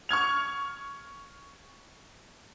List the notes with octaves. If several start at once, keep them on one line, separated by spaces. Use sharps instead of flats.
C#6 F6 G#6 F7